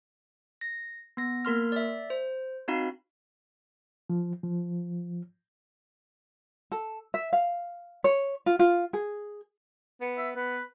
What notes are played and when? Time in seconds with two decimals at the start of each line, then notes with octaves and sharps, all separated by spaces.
0.61 A#6
1.17 B3 A#6
1.45 A#3 A#4 C6 F6
1.72 D5 E5
2.10 C5
2.68 C4 D#4 F#4 F5 B5
4.10 F3
4.43 F3
6.72 A4
7.14 E5
7.33 F5
8.04 C#5
8.46 F4
8.59 F4
8.93 G#4
10.01 B3
10.18 E5
10.36 B3 B4